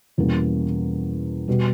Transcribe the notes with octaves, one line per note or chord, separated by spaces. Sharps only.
E2 B2 G3 A#3 C#4
B2 G3